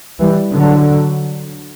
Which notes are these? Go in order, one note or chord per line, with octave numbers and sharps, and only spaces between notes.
E3 G3
D3 F#3